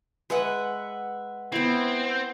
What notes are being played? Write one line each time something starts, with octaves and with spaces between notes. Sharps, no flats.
G#3 B4 E5 F#5
B3 C4 E4